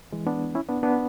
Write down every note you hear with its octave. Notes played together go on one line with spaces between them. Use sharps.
E3 G#3
B3 D4
C#4 E4
B3 D4
B3 D4